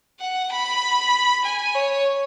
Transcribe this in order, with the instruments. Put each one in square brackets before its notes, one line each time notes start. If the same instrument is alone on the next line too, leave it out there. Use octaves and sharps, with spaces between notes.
[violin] F#5
B5
G#5
C#5